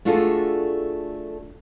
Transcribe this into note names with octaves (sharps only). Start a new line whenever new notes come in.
A3 D4 F4 F#4 G#4 A4